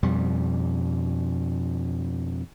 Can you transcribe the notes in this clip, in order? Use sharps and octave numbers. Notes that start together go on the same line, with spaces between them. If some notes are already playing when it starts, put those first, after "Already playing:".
F2 B2 G3